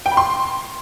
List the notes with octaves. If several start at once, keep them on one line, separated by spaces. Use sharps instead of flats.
G5
B5
C6